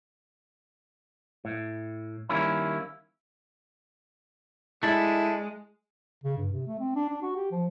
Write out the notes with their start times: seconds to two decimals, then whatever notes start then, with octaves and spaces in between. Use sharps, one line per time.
1.45 A2
2.29 D#3 G3 A#3 C#4 E4
4.83 G#3 A3 D4 E4
6.24 C#3
6.38 G2
6.52 C3
6.68 A3
6.80 C4
6.95 D4
7.09 D4
7.22 F#4
7.36 G4
7.52 F3